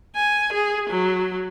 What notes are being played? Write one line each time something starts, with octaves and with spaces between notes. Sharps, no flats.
G#5
G#4
F#3